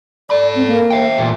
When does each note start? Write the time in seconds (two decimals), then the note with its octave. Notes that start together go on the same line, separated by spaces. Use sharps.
0.30 A4 D5 B5
0.55 C4
0.67 A#3
0.90 E5 G5
1.18 E2 A#2